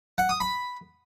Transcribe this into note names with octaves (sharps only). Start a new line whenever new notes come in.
F#5
D#6
B5